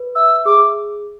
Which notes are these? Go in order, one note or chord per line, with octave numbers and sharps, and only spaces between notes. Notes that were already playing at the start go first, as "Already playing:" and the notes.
Already playing: B4
E5 E6
G#4 D6